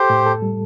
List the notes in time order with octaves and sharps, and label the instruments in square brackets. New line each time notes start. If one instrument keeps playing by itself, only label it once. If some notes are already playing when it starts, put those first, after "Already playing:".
Already playing: [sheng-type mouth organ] G4 C5 [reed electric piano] A4
[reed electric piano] A2
A4
G3